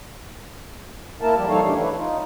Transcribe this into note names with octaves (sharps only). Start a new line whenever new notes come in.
A#3 E4 A#4 A5
F3 G3 G4
F3 G3 D#4 A4 C#5 F5
C#3 E3 A3 D4 G4
E4 B4 C#5
D#4 F4